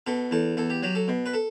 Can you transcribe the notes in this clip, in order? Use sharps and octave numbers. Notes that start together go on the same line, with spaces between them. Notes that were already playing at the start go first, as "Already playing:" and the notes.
B2 A4
E2 A4
E2 A4
G4
F#3 G4
A4
B2
B4
A4